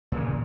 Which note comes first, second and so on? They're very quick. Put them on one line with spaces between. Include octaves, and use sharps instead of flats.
A#2 C#3 E3